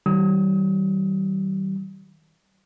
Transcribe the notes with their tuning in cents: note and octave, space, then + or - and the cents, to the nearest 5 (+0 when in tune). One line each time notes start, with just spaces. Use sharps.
D#3 +25 G3 -35 D#6 +35